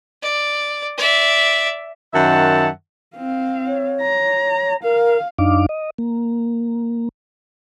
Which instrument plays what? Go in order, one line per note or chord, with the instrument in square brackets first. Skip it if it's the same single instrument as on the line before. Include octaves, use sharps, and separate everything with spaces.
[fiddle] D5
D5 E5
[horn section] F#2 D#3 E5 F#5 A5
[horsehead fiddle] C4 F5
[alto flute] C#5
[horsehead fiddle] A#5
[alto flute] A#4 [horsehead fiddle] F5
[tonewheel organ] F#2 D4 D#4 F5 D6
D#5
A#3